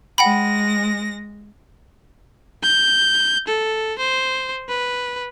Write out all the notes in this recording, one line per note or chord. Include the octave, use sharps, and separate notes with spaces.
G#3 F#5 G5 B5 A#6
G6
A4
C5
B4